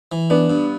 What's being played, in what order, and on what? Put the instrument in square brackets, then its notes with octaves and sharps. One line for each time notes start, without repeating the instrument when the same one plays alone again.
[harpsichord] E3
[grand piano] B3 [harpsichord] D4
[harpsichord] G2